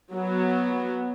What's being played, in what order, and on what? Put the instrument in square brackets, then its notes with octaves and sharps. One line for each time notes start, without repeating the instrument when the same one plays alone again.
[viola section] F#3 B3